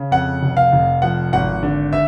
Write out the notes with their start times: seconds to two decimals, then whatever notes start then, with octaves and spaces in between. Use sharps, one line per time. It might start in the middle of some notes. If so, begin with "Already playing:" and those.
Already playing: C#3
0.11 F2 F#5
0.42 F1
0.57 F5
0.72 F1
1.02 F3 F#5
1.33 G#1 F#5
1.63 D3
1.93 E5